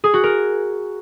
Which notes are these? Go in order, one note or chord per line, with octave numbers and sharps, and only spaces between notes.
G#4
F#4
A#4